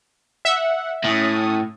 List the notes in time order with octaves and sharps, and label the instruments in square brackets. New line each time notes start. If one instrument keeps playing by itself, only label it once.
[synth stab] E5 [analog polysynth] F#5
[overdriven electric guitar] A2 [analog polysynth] C#4 D#6